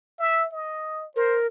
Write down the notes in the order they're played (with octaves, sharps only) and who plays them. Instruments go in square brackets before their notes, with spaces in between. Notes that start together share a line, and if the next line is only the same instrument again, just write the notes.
[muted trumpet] E5
D#5
[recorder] A#4 [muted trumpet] C5